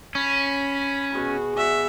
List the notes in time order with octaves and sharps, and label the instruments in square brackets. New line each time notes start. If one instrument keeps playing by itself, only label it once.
[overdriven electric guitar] C#4 [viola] B5
[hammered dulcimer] B2 G#4 B5 [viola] F#4
[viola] F#4 E5 [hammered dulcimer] D5 F#5 G#5